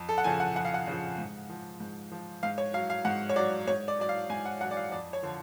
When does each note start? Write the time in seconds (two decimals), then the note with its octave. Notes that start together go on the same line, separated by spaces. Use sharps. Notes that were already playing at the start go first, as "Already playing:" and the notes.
Already playing: F2
0.09 A4
0.18 F#5
0.24 C#3 F3 G#5
0.40 F#5
0.56 F2 F#5
0.65 F5
0.74 F#5
0.87 C#3 F3
1.18 G#2
1.50 F3
1.80 G#2
2.12 F3
2.43 G#2 F5
2.58 C#5
2.74 F#3 F5
2.90 F5
3.05 G#2 F#5
3.29 C#5
3.36 F#3 D5
3.67 G#2 C#5
3.88 D5
3.99 F#3 D5
4.09 F5
4.30 G#2 G#5
4.45 F#5
4.61 F#3 F#5
4.71 D5
4.77 F5
4.92 F2 D5
5.13 C#5
5.23 D3 F3